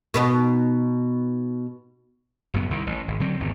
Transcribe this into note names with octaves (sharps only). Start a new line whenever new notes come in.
B2 B3 D#4
F#1 F#2 B3
C2 D#3
A1
G#1
D3 F#3 C4
G#1 E2 G#2